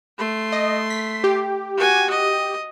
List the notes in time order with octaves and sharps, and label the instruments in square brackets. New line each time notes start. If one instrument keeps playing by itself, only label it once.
[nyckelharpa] A3 C6
[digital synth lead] D#5
B6
G4
[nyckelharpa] F#4 G#5
D#5